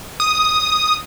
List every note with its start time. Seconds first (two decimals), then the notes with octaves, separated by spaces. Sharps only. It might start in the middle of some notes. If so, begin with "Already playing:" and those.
0.20 D#6